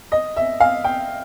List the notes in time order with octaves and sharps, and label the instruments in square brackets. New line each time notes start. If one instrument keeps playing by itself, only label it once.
[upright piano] D#5
E5
F5
G5